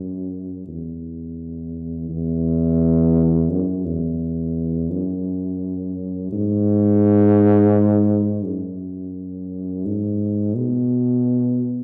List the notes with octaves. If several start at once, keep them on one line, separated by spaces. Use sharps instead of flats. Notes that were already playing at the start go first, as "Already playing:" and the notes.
Already playing: F#2
E2
E2
F#2
E2
F#2
G#2
F#2
G#2
B2